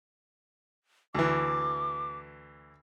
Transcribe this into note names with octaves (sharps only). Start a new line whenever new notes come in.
D2 E3 D6